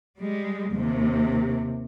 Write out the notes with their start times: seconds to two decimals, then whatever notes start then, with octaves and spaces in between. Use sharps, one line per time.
0.18 G3 G#3
0.71 D#2 C3